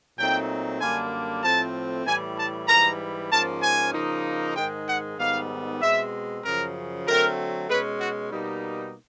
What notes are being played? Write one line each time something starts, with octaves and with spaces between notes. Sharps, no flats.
A#2 F#3 A3 C4 D#4 G5
F#2 D3 G3 A#3 D4 G#5
A2 F3 A3 C4 A5
A2 E3 G3 G#5
A5
G#2 E3 G3 A#5
G#2 F3 A#3 C#4 A5
G#5
C#3 F3 A#3 D#4
G#2 D#3 G#3 G5
F#5
G#2 D#3 G3 B3 F5
B2 G#3 C4 E5
F#2 C#3 F3 A#4
D3 F#3 A3 C4 A#4
B2 G#3 C#4 B4
F#4
B2 G3 A#3 D#4